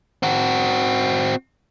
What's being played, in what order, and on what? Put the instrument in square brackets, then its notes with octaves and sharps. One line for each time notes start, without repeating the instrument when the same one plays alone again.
[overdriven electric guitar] C4 F#4